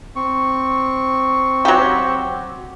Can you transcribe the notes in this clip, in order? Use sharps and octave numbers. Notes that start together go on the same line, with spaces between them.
C4 C#6
F#3 G4